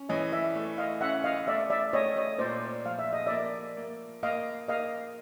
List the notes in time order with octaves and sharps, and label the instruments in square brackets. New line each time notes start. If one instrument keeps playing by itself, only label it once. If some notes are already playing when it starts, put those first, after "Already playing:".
Already playing: [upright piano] C#4
[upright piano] E3 [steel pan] C#5 D#5
[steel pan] D5 E5
[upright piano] A3
[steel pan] D#5 F5
[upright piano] C#4 [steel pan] E5 F#5
[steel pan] D#5 F5
[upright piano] A3 [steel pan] D5 E5
[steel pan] D5 E5
[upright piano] A3 [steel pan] C#5 D#5
[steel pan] C#5 D#5
[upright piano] A#2 [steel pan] C5 D5
[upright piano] F3 [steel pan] F5
[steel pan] E5
D#5
[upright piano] A#3 [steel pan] D5 E5
[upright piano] A#3
[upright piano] A#3 [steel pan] D#5 F5
[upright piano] A#3 [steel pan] D#5 F5